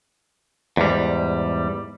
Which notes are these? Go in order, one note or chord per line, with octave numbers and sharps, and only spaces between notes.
E2 G#2 G3